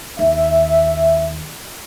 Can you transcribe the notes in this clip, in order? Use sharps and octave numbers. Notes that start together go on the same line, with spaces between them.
D#2 E5